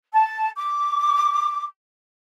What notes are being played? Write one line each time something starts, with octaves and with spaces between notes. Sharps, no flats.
A5
D6